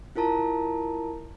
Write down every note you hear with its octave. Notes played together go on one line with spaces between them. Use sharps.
E4 F4 A#4 A5 A#5